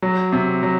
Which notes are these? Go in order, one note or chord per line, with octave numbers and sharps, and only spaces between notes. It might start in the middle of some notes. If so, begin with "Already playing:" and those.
F#3
C3
F#3